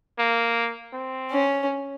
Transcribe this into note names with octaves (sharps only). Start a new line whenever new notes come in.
A#3
C4
C#4